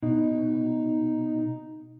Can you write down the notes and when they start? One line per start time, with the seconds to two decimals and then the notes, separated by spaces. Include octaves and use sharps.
0.03 B2 D#4